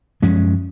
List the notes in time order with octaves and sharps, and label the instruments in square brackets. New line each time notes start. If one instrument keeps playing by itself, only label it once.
[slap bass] F#2 F3 G#3 C#4